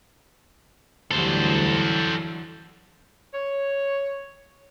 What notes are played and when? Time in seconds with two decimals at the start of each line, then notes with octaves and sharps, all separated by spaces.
1.11 D2 D3 E3 F#3 G3 A4 C5
3.34 C#5